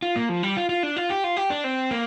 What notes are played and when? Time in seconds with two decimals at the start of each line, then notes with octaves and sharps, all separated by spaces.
0.02 F4
0.16 A#3
0.29 F3
0.43 G3
0.57 F4
0.69 F4
0.83 D4
0.97 F4
1.10 G4
1.24 F4
1.37 G4
1.50 D4
1.64 C4
1.91 A#3